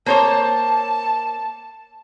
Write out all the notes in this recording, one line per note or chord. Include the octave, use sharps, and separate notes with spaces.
A#3 C5 C#5 A5